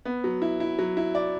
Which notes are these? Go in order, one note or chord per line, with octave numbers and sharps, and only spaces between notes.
B3
F#3
E4
E4
F#3
E4
D5